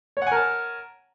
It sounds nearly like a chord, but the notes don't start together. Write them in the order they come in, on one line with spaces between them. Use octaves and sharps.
C#5 F#5 G#5 A#4 A5